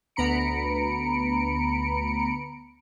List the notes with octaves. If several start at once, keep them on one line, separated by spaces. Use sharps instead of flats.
D2 B3 A#5 B5 C#7 D7